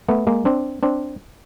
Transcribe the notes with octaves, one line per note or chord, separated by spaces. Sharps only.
A3 B3
G#3 A#3
C4 D4
C4 D4